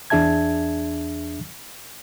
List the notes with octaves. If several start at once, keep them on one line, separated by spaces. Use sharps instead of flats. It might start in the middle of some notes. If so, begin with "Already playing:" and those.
E2 D4 G#4 E5 A5 G#6